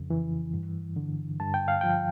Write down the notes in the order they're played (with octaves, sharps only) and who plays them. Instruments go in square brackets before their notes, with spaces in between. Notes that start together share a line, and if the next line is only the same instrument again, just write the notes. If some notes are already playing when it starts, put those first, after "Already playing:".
Already playing: [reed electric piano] F2 C#3
E3
G2
D3
G2 A5
G5
F5
F3 G5